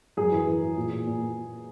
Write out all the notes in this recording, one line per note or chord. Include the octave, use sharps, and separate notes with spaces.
F#2 G#4
E3
E3
E3
A#2
A#2
A#2
A#2